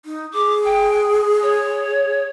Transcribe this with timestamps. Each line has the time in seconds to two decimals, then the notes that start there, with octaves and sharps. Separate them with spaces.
0.05 D#4
0.33 G#4 D6
0.65 G5
1.43 C#5